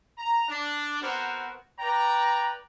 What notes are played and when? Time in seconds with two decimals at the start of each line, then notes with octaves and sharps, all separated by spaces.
0.18 A#5
0.49 D4
1.01 B3 C4 F#4 A#4 C5 A#5
1.79 B4 D5 G5 A#5